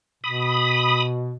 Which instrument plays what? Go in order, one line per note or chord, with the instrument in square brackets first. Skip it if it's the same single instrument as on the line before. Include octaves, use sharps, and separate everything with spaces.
[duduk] B2 [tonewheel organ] B5 D#6